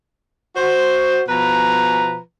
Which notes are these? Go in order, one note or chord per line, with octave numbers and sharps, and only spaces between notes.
F#4 C5
B2 F3 B4 A#5